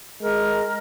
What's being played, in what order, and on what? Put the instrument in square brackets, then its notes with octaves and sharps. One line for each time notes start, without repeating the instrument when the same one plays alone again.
[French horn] G#3 [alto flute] A#4